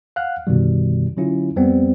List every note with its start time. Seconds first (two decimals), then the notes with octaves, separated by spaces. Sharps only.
0.16 F5 F#5 F6 F#6
0.47 F#2 B2 D3 D#3 G3
1.17 D3 F#3 C#4 E4 F4
1.56 F2 G3 B3 C4